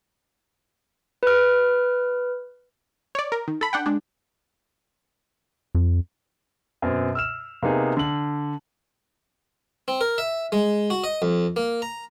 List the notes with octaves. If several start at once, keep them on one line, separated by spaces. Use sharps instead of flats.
B4 F6
C#5 D5
A#4
D#3
A4 B5
D4 F#5 G5
G#3 D4
F2
F#2 B2 C4
E6 F6 E7
C3 A#3 B3 D#4 G#4
D3 F#7
C4
A#4
E5
G#3
F#4
D#5
F2
A#3
A#5